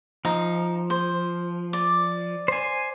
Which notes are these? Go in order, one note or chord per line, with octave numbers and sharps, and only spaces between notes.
F3 D#4
C5
D5
C5 G#5